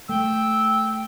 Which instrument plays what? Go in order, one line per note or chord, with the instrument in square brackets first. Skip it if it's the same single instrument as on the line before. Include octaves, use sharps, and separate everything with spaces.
[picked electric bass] A3 [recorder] G5 [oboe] E6